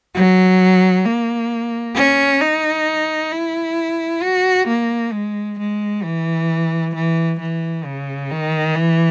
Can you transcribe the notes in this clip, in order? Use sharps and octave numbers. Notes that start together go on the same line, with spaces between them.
F#3
A#3
C#4
D#4
E4
F#4
A#3
G#3
G#3
E3
E3
E3
C#3
D#3
E3